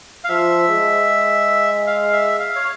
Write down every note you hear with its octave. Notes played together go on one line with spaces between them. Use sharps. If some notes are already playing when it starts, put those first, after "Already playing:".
F5
F3 E5
G#3
F5
E5
F5
C#5